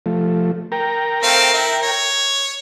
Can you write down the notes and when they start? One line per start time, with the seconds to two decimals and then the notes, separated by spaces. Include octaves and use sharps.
0.06 F3 A3
0.72 A#4 G5 A#5
1.23 A3 C4 F5
1.53 E4
1.82 C#5